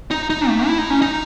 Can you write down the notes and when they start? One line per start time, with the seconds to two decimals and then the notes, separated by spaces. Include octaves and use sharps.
0.11 D#4
0.30 D#4
0.48 A3
0.67 E4
0.78 D#4
0.90 C#4
1.02 D#4